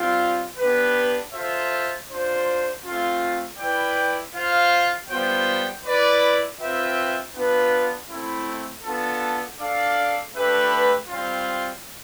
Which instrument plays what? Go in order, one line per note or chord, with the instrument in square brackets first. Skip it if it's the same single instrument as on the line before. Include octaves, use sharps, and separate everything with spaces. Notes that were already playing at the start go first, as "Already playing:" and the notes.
Already playing: [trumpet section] G3 C4 F4
B3 D4 G4 B4
F4 A4 C5 E5
D4 F4 C5
A3 C4 F4
E4 B4 D5 G5
F4 C5 F5
G3 B3 F4 C5 G5
E4 B4 D5
C4 F4 B4 E5 G5
B3 D4 F4 B4
A3 C4 E4
B3 D4 F4 A4
D4 A4 D5 F5
A3 D4 G4 B4 E5
G3 C4 F4